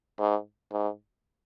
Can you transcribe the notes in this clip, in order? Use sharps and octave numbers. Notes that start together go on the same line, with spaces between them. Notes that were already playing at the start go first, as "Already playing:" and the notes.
G#2
G#2